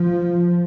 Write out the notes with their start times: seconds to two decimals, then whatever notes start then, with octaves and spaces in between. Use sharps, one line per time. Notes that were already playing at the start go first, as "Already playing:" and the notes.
Already playing: F3